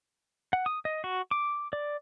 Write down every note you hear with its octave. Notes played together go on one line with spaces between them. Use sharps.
F#5
D#6
D#5
F#4
D6
D5